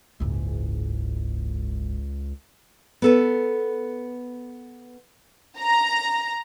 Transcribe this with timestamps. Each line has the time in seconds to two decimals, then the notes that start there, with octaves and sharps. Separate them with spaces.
0.20 F#1 C#2 G#2
3.02 B3 A4 B4
5.58 A#5